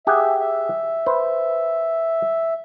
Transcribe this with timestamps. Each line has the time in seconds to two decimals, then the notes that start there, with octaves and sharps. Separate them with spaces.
0.07 G4 G#4 E5 F#5
0.40 E5
1.06 B4 C5